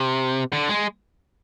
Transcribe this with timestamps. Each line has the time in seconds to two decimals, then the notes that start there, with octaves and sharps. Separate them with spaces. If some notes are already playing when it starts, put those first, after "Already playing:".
Already playing: C3
0.53 D3
0.69 G#3